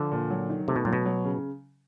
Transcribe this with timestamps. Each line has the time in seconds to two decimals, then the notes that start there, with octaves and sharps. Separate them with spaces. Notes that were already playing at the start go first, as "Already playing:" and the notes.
Already playing: D3 F3
0.12 A#2
0.30 F#3
0.49 D#3
0.68 C3 A3
0.76 B2
0.85 A#2 F#3
0.93 B2
1.05 F#3
1.25 C#3